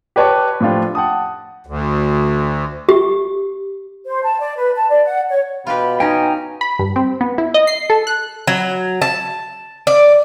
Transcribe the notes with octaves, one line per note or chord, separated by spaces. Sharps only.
G4 B4 C#5 A5 D6
A2 F3 D4 F4 G4
F#5 G5 A5 D#6
D2
G4
C5
A5
D5
B4
A5
D5
F#5
C#5
B2 F4 G4 B4 B5
C#4 D#4 G5 G#5 A#5
B5
G2
C4
B3
E4
D#5
C7
A4
F#6
F#3
A5
D5